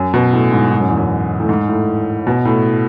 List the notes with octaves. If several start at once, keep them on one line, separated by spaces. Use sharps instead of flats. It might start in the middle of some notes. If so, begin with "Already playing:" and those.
Already playing: F#2
B2
A2
G#2
G#2
F#2
E2
F#2
A2
G#2
A2
B2
A2